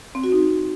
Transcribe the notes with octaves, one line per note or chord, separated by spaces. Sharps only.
C4
F#4
D#4